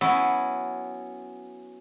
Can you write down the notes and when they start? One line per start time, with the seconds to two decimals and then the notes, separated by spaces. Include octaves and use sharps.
0.01 F#3 B3 C#4 E4